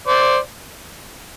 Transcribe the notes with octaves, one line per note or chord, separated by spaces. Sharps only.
C5 D5